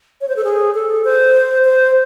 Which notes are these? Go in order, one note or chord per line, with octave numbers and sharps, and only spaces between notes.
C#5
C5
A4
G#4
A4
C5
C5